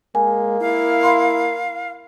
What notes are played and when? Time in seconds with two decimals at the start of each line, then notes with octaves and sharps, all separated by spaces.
0.15 G#3 A#3 G#5
0.61 E4 F5
1.03 B5 C6